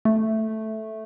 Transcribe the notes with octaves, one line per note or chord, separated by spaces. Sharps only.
A3